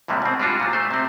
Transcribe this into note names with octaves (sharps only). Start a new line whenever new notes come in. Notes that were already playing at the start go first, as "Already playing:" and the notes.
D#2 A2 C3 G3 G#3
B2 C4
G3 G#3 D4 F4 F#4
A#2 F#3
A3 C5
C3 C4